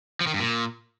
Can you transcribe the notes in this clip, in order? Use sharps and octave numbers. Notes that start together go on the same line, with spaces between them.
F3
D#3
G2
A#2